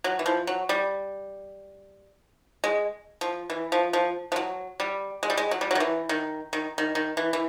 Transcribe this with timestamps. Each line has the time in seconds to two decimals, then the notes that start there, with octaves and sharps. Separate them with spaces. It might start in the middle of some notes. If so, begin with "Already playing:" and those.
0.04 F#3
0.19 E3
0.26 F3
0.47 F#3
0.69 G3
2.64 G#3
3.21 F3
3.50 E3
3.72 F3
3.93 F3
4.32 F3
4.36 F#3
4.80 G3
5.23 G#3
5.30 G3
5.37 G#3
5.51 F#3
5.61 G3
5.71 F#3
5.75 D#3
5.80 E3
6.09 D#3
6.53 D#3
6.78 D#3
6.95 D#3
7.17 E3
7.33 E3